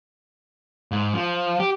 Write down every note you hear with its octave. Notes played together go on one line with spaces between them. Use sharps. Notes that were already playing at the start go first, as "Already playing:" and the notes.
G#2
F3
G4